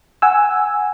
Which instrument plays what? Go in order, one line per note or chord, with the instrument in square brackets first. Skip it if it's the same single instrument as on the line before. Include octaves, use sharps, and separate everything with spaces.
[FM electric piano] F#5 G#5 E6